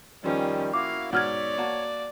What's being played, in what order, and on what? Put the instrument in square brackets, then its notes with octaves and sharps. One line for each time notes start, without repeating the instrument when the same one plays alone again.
[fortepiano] F2 F3 [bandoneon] D#3 G3 [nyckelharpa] C#4
[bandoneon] A#3 E4 F#4 [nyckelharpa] F5 [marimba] D6
[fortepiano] G#2 B2 [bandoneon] C#5 [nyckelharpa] D5 [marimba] F#5 F6 G#6
[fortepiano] A#3 F#4 A5